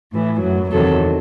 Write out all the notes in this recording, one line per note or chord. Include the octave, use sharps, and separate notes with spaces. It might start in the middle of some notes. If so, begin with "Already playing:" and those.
A2 E3
F#2 F#3
E2 C3 D#3 F#3 A4